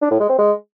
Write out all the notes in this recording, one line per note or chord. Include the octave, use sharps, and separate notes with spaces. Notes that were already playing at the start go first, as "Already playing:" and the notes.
D4
A2
G#3
C4
G#3